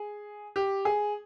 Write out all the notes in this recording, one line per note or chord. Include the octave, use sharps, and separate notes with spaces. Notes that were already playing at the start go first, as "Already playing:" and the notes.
Already playing: G#4
G4
G#4